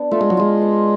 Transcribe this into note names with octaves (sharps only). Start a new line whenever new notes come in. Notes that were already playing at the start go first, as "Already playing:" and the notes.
Already playing: B3 D4
A3 F4
G#3
F#3
G#3 F4
B3